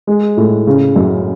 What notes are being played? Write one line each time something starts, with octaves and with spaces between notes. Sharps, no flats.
G#3
A2
C#3
F#2